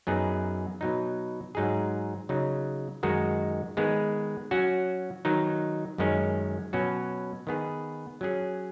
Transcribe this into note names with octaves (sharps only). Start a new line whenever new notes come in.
F#2 F#3 B3 D#4 G#4
B2 F#3 D#4
G#2 F#3 D#4 G#4
C#3 F#3 D#4
F#2 D#3 G#3 D#4 F#4
D#3 G#3 B3 G#4
F#3 C#4 F#4
D#3 F#3 D#4
F#2 D#3 G#3 C#4
B2 F#3 C#4 F#4
D#3 B3 G#4
F#3 C#4 G#4